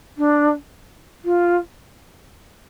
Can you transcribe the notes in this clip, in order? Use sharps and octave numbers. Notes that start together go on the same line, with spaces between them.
D4
F4